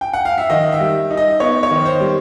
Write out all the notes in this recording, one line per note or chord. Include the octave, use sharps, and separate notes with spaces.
G5
F#5
F5
E5
D#3 D#5
E5
G3
D#4
D#5
B3 C#5
C#5
D#3
C5
G3